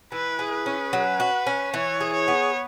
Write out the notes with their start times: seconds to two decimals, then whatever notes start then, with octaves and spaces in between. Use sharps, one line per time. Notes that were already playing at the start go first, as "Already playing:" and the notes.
0.12 E3 B4
0.39 G#4
0.53 B4
0.66 C#4
0.93 F#3
1.20 F#4
1.47 C#4
1.74 E3 C#5
2.01 G#4
2.13 C#5
2.28 B3